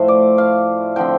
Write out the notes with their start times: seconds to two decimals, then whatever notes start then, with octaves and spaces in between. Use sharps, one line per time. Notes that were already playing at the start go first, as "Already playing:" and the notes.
Already playing: A2 F3 A3 C5
0.08 D5
0.38 F5
0.96 D3 F3 C4 G5